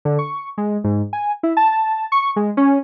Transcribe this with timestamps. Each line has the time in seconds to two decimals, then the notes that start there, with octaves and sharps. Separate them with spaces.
0.05 D3
0.19 C#6
0.58 G#3
0.84 G#2
1.13 G#5
1.43 E4
1.57 A5
2.12 C#6
2.36 G#3
2.57 C#4